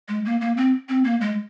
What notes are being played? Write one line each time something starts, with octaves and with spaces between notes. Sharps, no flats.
G#3
A#3
A#3
C4
C4
A#3
G#3